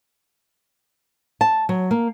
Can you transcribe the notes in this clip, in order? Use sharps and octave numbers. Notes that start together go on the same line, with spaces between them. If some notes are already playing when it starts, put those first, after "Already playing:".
A5
F#3
A#3